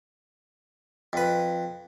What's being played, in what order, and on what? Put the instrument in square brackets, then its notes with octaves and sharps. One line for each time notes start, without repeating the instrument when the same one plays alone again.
[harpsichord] F2 B4